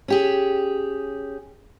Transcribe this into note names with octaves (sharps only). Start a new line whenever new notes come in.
C#4 G4 G#4